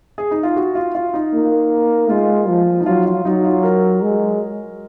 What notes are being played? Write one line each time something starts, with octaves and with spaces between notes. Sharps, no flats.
G#4
D#4
F4
F#4
F4
F4
D#4
A#3
G#3 F4
F3
D#4
F#3 F4
F4
F#3 D#4
F4
A#4
G#3